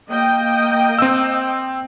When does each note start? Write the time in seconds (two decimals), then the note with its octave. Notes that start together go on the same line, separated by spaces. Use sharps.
0.11 A#3 D#5 G5
0.99 C4 E6